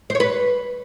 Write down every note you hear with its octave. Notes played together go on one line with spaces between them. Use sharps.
C5
C#5
B4